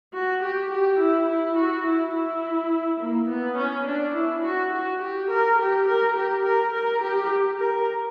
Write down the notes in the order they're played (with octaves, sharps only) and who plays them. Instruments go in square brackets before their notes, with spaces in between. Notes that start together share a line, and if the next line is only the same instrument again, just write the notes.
[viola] F#4
G4
G4
E4
E4
F#4
E4
E4
A#3
B3
C#4
D4
E4
F#4
F#4
G4
A#4
G4
A#4
G4
A#4
A#4
G4
A#4